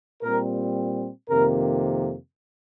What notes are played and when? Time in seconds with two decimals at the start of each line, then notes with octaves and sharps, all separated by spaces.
0.22 A#2 G3 C4 A#4
1.29 F2 C3 D#3 A#3 A#4